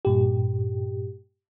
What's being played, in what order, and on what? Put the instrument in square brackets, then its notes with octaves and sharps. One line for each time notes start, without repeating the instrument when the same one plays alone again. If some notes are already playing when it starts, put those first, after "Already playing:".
[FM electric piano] G2 A#2 G4